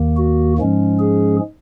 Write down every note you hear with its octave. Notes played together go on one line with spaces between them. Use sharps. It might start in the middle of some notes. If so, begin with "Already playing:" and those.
Already playing: D#2 D#3 A#3
F#4
G#2 F3 G#3 C#4
G#4